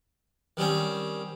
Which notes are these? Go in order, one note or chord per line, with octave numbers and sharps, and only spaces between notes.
D#3 G3 C4 C#4